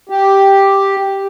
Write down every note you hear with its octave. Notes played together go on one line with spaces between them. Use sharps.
G4